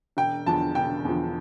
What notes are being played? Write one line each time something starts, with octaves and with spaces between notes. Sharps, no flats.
E1 G5
E2 D3 F3 A5
E1 G5
E2 D3 F3